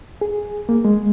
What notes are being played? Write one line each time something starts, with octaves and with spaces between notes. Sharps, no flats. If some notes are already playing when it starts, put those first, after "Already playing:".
G#4
A#3
G#3